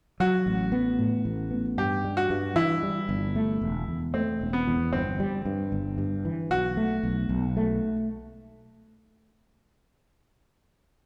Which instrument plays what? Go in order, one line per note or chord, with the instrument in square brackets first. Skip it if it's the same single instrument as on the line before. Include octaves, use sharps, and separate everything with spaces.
[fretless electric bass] F#3 [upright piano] F#4
[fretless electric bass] A1
B3
A2
A1
B3
[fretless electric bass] G2 [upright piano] G4
[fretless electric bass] G3
[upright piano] F#4
[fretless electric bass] G2
[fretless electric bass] E3 [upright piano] E4
[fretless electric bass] G3
G1
A3
E1
E2
[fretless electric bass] A3 [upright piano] C4
[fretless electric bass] E1
[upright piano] B3
[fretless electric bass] E2
[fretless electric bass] G1 [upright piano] C4
[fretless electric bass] G3
G2
G1
G2
E3
[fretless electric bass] B1 [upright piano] F#4
[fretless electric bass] A3
B1
B1
A3